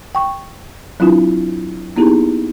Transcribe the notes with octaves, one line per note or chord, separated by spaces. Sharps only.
G5 C#6
F#3 C4 D4 E4 F4
A#3 B3 D#4 E4 G4 G#4